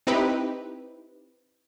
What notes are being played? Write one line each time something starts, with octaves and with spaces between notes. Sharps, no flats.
C4 D#4 E4 G4 B4